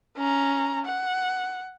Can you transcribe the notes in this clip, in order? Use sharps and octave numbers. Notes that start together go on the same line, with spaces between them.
C#4 A#5
F#5